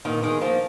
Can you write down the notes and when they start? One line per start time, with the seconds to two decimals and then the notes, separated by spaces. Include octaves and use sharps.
0.05 A#2 D#3
0.23 D#3 G#3
0.41 F3 A#3